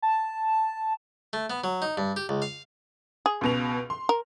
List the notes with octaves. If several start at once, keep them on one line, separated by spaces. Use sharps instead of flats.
A5
A3
B3
F#3
D#4
G2
G4
C#2
F5
G#4
C#2 B2 F7
C6
A#4